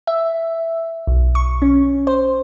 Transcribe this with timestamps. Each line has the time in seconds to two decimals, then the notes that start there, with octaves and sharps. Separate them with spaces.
0.07 E5
1.07 B1
1.35 C#6
1.62 C#4
2.07 C5